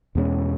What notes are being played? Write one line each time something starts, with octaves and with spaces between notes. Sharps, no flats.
E2 B2 G#3 C#4